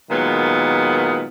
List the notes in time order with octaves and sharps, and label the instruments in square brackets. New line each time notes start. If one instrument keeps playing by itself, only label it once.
[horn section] A#2 D#3 F#3 G#3 B3